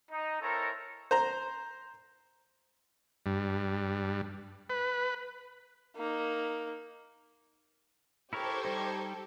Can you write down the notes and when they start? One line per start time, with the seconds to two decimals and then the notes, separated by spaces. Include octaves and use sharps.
0.11 D#4
0.42 C4 E4 A4 A#4 C#5 A#5
1.11 C5 A#5
3.26 G2
4.70 B4
5.96 A#3 D#4
8.33 E4 G4 A4 A#4 C5 C#5 C#6 G#6
8.65 G3 D#4